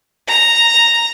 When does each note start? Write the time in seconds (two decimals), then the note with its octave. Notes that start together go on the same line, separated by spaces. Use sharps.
0.28 A#5